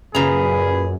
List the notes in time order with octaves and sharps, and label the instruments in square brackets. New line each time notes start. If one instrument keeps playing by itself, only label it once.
[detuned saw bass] F#2 [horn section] A#2 G#4 [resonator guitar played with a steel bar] C#3 A#5 [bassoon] B4